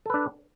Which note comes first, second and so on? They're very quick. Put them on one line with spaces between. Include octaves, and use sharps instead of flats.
A4 B4 D4